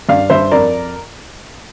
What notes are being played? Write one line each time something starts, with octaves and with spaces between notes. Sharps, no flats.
G2 D5 F5
G2 C5 E5
F2 A#4 D5